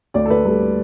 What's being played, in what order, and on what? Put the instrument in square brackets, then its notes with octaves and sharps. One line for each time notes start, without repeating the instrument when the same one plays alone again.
[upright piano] D2 D5
A4
D3 B4
G3 A4